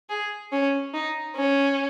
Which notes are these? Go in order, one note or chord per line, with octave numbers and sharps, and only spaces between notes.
G#4
C#4
D#4
C#4